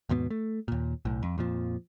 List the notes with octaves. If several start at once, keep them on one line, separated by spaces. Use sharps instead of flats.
D#2 G#2 B2 B3
A3
D#2 A#2
B1 A2
F2
F2 A#2 F3